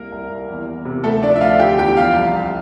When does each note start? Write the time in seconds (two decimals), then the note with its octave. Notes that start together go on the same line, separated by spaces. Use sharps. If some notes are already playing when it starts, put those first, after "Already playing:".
Already playing: C2 A#3 A#4
0.12 C2
0.29 C2
0.49 E2
0.67 E2
0.85 C3
1.04 D2 A3 A4
1.22 F3 D4 D5
1.36 E5
1.41 D2 F4 F5
1.59 D3 G4 G5
1.78 E2 G4 G5
1.96 F3 F4 F5
2.16 C2
2.35 C2